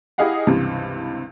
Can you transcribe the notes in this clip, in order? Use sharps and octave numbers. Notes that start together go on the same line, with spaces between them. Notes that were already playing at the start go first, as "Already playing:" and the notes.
E4 G4 G#4 D#5 F5 F#5
C#2 G2 C3 E3